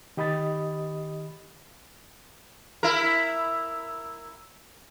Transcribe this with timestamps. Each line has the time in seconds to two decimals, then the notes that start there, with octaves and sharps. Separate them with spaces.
0.17 D#3 G4 D#5 B5 D#6 A6
2.83 E4 A#4